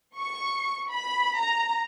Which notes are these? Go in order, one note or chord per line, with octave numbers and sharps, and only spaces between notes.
C#6
B5
A#5